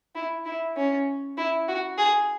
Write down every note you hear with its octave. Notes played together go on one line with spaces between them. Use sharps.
E4
E4
C#4
E4
F#4
G#4